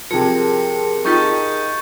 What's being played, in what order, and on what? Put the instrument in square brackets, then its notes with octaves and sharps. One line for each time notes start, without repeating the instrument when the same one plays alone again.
[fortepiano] C3 F3 [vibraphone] G#4 A#4 A5 [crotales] C#7
[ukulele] D#4 F4 G4 [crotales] C#6 G6 A6